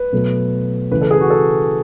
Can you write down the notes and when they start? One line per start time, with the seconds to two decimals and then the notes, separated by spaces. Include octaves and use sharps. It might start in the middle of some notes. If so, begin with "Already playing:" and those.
Already playing: B4
0.13 B2 F#3 A3
0.91 C#3 E3 A3 B4
1.01 A4
1.11 G#4
1.21 F#4
1.30 A4